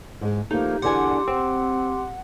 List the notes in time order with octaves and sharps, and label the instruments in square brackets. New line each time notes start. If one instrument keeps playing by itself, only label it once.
[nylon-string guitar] G#2 G#3
[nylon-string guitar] F3 A3 [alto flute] A#3 [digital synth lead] D#4 [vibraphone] G4
[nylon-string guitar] E2 D3 G#5 [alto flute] D4 [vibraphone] G4 C6 D6 [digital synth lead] F#5
[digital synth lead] C4 [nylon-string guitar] C5 [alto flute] F#5